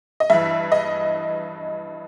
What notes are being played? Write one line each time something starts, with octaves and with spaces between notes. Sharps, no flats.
D#5
G2 E3 E5
D#5